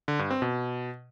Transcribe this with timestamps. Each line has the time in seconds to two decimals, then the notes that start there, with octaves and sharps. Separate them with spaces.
0.08 D3
0.19 G2
0.31 C4
0.42 B2